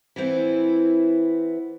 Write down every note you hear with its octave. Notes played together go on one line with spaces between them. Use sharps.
E3 B3 C4 E4